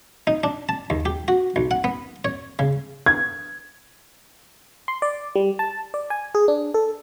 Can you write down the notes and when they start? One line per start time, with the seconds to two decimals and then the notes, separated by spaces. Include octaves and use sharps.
0.27 D#4
0.44 D4
0.69 A5
0.90 D#2
1.05 G4
1.28 F#4
1.56 B1
1.71 F#5
1.84 B3
2.25 C#5
2.59 C#3
3.06 G#6
4.88 C6
5.02 D5
5.36 G3
5.59 A5
5.94 D5
6.10 G#5
6.35 G#4
6.48 D4
6.74 A4